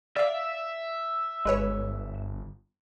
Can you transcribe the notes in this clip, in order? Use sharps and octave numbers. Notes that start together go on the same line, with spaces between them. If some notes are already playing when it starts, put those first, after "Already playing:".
D5 E5 F5
G1 G#3 B4 C#5